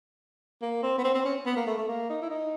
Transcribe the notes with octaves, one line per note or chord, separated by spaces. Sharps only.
A#3
C4
B3
C4
C4
C#4
B3
A#3
A3
A3
A#3
D#4
E4
D#4